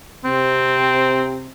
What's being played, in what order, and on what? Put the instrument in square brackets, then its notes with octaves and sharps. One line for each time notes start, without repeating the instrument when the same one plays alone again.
[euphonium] C3 [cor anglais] C4